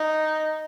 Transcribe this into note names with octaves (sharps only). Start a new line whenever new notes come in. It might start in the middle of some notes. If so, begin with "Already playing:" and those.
Already playing: D#4